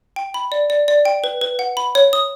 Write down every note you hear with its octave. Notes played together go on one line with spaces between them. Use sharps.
G5
B5
D5
D5
D5
G5
B4
B4
F#5
B5
C#5
D#6